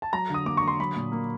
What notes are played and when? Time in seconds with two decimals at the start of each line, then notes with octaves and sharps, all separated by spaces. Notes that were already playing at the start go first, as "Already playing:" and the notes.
0.02 A5
0.13 F#3 A#5
0.30 D3 D#6
0.46 A#3 D6
0.57 D3 C#6
0.68 C6
0.80 F#3 B5
0.96 A#2
1.12 A#3